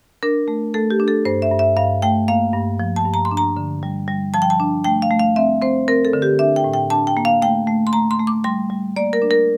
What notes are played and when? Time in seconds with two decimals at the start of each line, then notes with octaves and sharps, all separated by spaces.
0.23 D4 A#4
0.48 A3
0.74 A3 A4
0.91 G4
1.00 D4
1.08 A4
1.25 G2 C5
1.42 E5
1.51 G2
1.59 E5
1.77 G2 F5
2.02 A3 G5
2.28 A#3 F5
2.53 G2
2.80 F3
2.96 A5
3.05 G2
3.14 A#5
3.25 C6
3.31 D4
3.37 A#5
3.57 D3
3.83 G3
4.08 G3
4.34 F3 A5
4.42 G5
4.50 A5
4.60 D4
4.84 A3 G5
5.02 F5
5.11 A3
5.20 F5
5.36 C4 E5
5.62 C4 C5
5.88 C4 A#4
6.05 A4
6.13 D3
6.22 G4
6.39 D4 E5
6.56 G5
6.64 A2
6.74 G5
6.90 D4 A5
7.07 G5
7.17 A#3
7.25 F5
7.42 A3 G5
7.67 A3
7.87 C6
7.93 A3 A#5
8.11 C6
8.20 A3
8.27 D6
8.44 G3 C6
8.70 G3
8.96 A#3 D5
9.13 A#4
9.22 D4
9.31 A#4